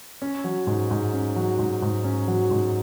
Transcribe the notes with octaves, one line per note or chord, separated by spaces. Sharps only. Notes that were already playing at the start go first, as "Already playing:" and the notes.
C#4
F#3
G#2
G#2
C#4
F#3
G#2
G#2
C#4
F#3
G#2